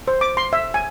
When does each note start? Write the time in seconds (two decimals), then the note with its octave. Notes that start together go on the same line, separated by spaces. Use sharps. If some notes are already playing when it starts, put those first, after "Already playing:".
0.08 C5
0.21 D6
0.37 C6
0.53 E5
0.74 G#5